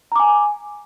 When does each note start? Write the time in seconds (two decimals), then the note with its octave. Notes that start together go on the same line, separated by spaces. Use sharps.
0.12 A#5
0.16 D6
0.20 G#5